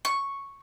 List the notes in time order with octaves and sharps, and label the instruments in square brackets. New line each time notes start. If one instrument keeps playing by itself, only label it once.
[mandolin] C#6